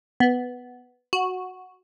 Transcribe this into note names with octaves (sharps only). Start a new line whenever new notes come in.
B3
F#4